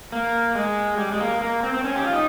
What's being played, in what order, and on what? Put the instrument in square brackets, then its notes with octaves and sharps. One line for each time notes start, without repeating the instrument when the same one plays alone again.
[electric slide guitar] A#3
G#3
G3
G#3
A#3
A#3
C4
C4
C#4
G4
F4
D#4